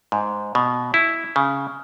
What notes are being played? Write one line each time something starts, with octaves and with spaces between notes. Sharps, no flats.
G#2
B2
E4
C#3